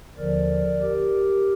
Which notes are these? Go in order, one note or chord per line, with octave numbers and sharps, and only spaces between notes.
D#2 D3 F3 A#4 D5
G4 A#4